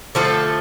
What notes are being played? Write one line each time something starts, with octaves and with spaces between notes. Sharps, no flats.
D3 F3 A3 A4